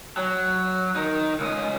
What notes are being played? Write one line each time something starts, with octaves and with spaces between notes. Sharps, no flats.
F#3
D#4 A#4
C#2 D#5